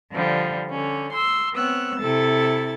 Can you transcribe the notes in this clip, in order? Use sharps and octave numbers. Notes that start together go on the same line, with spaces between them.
D3 F3 G3
D3 C#4
C6 E6
B3 C4 C#5 E6 F#6
C3 E4 A4 A6